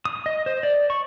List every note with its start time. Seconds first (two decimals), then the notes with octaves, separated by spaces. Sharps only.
0.05 D#6
0.26 D#5
0.46 C5
0.63 D5
0.90 C#6